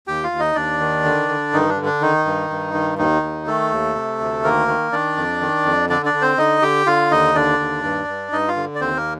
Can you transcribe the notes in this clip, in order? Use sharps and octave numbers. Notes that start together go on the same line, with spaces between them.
D#2 G4 G5
F4 F5
D#2
D#4 D#5
D#2 D4 D5
D#3
D3
D3
G2 D#3 D#4
D4
D3
D4
D#3 D#4
G2
G2
D#3
D#2 D#3 D#4
D#2
D#3 A3 A4
D#2
C3
D2
D#3 A#3 A#4
D#3
D#3 D4 D5
F2
D#3
F2
D3 D4 D5
D4 D5
D3
C4 C5
D3 D#4 D#5
D3 G4 G5
D3 F4 F5
D#2 D#4 D#5
D3 D4 D5
D#2
G2
G2
G2 D#4 D#5
F4 F5
D3
D5
D#2 C4 C5
A#3 A#4